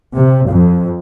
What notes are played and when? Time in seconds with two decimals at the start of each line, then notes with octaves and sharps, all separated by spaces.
0.13 C3
0.46 F2